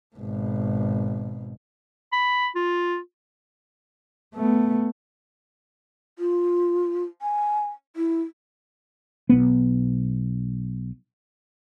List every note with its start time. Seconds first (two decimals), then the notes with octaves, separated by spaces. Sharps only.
0.16 G#1 B2
2.12 B5
2.55 F4
4.34 A3 B3
6.19 F4
7.22 G#5
7.96 E4
9.29 B1 B3